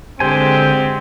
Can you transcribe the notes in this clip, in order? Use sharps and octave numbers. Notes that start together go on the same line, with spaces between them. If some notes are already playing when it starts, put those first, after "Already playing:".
D3 G#3 C4 G4 C5 G#5